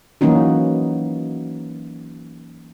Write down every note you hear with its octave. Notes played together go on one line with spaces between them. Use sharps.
E3 F#3 A#3 C#4 D#4 F#4